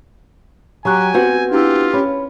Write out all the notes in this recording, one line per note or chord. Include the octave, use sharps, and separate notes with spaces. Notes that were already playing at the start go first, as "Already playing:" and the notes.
F#3 G4 G#5 A#5 C#6 F#6
B3 C4 F#4 G6
D4 E4 F4 G4 E6
C#4 B5